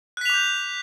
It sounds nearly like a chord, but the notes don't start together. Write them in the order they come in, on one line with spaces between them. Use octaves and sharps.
F#6 B6 F7 D6 G6